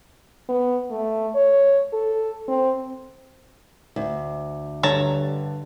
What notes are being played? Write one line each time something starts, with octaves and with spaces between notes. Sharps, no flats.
B3
A3
C#5
A4
C4
D2
G2 D3 C#5 A5 A#5